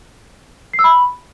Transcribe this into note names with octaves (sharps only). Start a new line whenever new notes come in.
C7
E6
B5